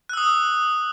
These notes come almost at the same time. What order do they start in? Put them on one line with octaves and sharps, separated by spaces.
F#6 E6 D#6